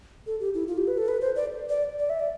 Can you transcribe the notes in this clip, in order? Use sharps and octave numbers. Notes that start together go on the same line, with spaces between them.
A4
G4
E4
F4
G4
B4
A4
B4
C5
D5
D5
D5
E5
D5